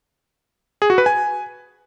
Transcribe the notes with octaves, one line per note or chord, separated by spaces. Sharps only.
G#4
F#4
B4
G#5